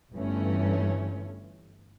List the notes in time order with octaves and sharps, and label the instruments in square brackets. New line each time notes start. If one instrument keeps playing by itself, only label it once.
[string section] G1 G2 E3 A3 C#4